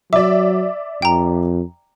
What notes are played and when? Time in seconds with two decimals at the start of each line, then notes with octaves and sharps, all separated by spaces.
0.13 F#3 D5 E5 D6
1.02 F2 G5 A#5